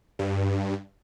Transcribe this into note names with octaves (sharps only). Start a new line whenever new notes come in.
G2